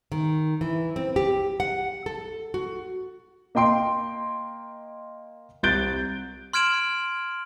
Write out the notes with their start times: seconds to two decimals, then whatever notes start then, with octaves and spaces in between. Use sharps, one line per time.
0.12 D#3
0.61 E3
0.96 C4
1.16 G4
1.60 F#5
2.06 A4
2.54 F#4
3.55 A#3 D#5 G5 C6 D7
5.63 C2 F#6 G6 A6 D7 G7
6.53 C6 F6 G#6 D7 E7 F#7